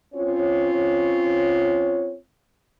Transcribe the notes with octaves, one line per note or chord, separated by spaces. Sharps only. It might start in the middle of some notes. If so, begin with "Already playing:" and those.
C4 C#4 F4 C#5